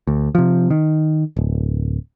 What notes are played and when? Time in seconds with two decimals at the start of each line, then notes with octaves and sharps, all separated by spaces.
0.07 D2
0.35 C3 F3
0.70 D#3
1.37 D1